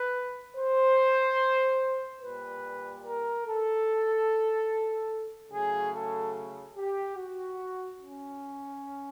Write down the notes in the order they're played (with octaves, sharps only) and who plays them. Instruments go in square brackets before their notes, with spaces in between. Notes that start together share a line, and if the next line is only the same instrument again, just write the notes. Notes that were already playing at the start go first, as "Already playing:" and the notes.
Already playing: [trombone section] B4
C5
A#2 G3 B4
A#4
A4
C#3 F#3 A3 G#4
A4
G4
F#4
C#4